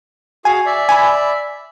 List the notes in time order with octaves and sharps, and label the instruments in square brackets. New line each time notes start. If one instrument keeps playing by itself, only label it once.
[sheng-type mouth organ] F#4 G#4 F5 [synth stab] G#5
[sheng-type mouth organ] D5 E5
[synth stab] G#5 B5